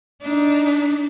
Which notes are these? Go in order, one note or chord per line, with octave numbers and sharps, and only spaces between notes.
D4 D#4